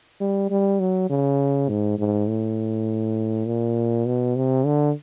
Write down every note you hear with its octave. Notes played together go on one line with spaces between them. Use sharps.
G3
G3
F#3
C#3
G#2
G#2
A2
A#2
B2
C3
D3